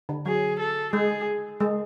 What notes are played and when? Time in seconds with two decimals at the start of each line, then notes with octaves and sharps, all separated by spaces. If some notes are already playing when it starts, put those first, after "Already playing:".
0.09 D3
0.26 F#3 G#4
0.60 A4
0.93 G#3 G#4
1.60 G#3